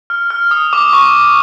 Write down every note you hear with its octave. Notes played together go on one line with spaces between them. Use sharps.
F6
F6
D#6
D6
C#6